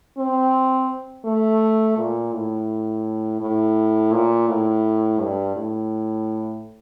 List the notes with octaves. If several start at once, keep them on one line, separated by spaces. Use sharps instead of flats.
C4
A3
A#2
A2
A2
A#2
A2
G2
A2